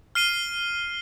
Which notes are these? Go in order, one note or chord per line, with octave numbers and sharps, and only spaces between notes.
F6 C7 D#7 G7